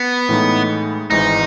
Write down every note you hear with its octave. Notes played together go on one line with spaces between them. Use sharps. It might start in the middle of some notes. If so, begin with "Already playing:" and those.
Already playing: B3
A2 E3 G#3 D#4
G#1 G#2 E3 D#4